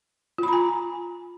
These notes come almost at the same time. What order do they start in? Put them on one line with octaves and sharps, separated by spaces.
F4 B5 A#5 G#5